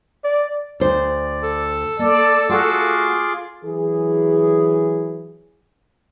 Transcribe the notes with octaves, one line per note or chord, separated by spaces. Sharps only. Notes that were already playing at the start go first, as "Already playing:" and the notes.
D5
D2 C5 D5
A4
A#3 D5 A5
A3 F4 F#4 G#4 D6
E3 F#3 G#4